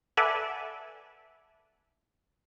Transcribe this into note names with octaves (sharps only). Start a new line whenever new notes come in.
A4 B4 D5 E5 F#5 G#5